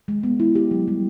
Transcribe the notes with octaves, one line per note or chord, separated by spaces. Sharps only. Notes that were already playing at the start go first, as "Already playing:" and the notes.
G#3
B3
E4
G4
F#3
G3